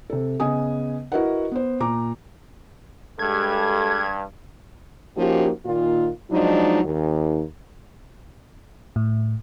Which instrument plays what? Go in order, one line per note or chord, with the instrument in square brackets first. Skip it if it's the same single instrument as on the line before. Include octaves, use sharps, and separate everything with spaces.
[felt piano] C3 A4
C#3 B3 D#5 G#5 D#6
E4 F#4 A#4 B4 D#5 F#5
B3 C5
A#2 A#5 D6
[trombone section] G2 [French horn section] G#3 G4 A4 [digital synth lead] G#6
[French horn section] F3 A#3 C#4 D#4 F#4 G4
A#2 D#3 F4
F3 F#3 G#3 D4 D#4
D#2
[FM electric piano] A2